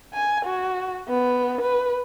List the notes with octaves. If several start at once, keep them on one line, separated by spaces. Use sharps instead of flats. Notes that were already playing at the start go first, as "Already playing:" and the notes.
G#5
F#4
B3
B4